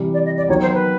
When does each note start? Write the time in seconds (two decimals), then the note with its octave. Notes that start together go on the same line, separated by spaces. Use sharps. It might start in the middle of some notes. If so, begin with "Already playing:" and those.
Already playing: C3 E3 G3
0.13 D5
0.25 D#5
0.37 D5
0.48 D#3 F#3 B3 C#5
0.61 C5
0.73 B4